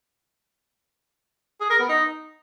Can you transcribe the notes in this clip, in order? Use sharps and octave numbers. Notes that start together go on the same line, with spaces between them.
G#4
A#4
B3
D#4